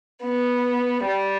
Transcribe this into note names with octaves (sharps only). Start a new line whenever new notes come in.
B3
G3